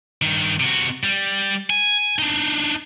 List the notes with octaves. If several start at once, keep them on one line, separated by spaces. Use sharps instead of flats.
G2 D#3
C3 F#4
G3
G#5
D4 D#4